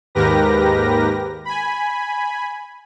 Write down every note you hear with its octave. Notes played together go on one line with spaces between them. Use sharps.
D#2 G#2 G4 A#4 B4 A#6
G#5 B5